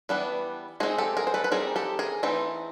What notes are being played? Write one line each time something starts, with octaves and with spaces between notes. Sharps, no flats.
E3 G3 B3 D4
G#3 C4 D#4 F#4 G#4
G4 A4
G#4 A#4
C5
A4 B4
B4
G3 C4 D#4 G#4 A#4
G4 A4
G#4 A#4
E3 A3 C4 D#4